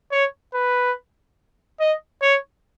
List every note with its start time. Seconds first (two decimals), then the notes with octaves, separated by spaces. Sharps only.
0.12 C#5
0.54 B4
1.80 D#5
2.22 C#5